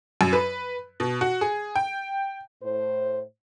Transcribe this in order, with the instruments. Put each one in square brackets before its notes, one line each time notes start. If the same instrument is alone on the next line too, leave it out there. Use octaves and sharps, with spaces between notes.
[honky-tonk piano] F#2
B4
B2
F#4
G#4
G5
[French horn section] A2 C5